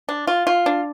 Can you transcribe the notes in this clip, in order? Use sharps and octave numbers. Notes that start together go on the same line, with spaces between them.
D4
F4
F4
D4